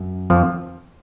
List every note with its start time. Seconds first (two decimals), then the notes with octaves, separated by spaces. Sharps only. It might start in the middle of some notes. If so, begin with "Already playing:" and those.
Already playing: F#2
0.30 F2 F3